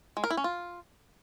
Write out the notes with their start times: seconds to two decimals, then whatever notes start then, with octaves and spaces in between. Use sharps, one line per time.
0.17 G#3
0.24 A#4
0.30 E4
0.37 C#4
0.44 F4